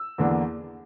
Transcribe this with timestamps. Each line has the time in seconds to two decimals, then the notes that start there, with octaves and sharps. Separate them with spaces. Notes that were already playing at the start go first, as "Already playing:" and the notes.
Already playing: E6
0.18 E2 D3 A#3 D4